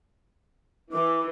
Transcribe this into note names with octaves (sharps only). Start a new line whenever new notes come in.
E3 D6